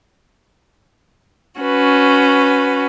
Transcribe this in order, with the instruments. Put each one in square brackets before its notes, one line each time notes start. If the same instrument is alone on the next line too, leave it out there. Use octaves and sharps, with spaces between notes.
[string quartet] C#4 F#4 B4